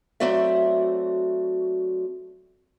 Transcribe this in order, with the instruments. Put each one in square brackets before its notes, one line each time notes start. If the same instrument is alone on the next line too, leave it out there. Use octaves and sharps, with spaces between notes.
[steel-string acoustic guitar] F#3 A3 C4 F#4 D5 E5